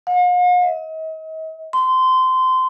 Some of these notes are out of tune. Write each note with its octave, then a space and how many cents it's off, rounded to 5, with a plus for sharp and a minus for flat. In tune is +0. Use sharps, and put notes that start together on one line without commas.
F5 +45
D#5 +40
C6 -20